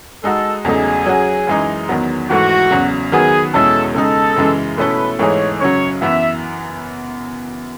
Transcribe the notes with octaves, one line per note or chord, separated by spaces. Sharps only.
G#3 D#4 F#4 A4
E2 C#3 F#3 A3 D#4 G#4
F#3 C#4 F#4
F#2 E3 G#3 D#4
E2 D#3 F#3 B3
G#2 E3 A3 F#4
E2 C#3 F#3
D#3 F#3 B3 F#4 G#4 B4
E2 B2 G#3 C#4 E4 A4
C#3 G#3 D#4 A4
F#2 C#3 E3 G#3
B2 A3 C#4 E4 A4 B4
G#2 E3 A3 D#4 G#4 C#5
F#2 C#3 F#3 C#5
F#2 E3 B3 E5